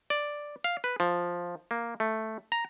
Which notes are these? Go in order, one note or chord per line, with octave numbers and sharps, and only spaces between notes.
D5
F5
B4
F3
A#3
A3
A#5